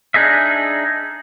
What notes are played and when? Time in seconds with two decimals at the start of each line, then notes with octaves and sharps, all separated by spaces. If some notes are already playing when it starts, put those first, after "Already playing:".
0.14 D4 D#4 G#4 D#5 E5